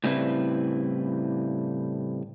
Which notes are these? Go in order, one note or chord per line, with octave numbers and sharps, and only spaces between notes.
A2 C#3 G3 C4 E4 B4